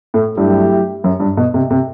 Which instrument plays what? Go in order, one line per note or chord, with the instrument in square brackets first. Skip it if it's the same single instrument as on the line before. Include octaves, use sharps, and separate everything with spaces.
[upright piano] A2
[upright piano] G2 [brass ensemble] F#3 A3 E4 G4
[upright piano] F#2
G2
B2
C3
C3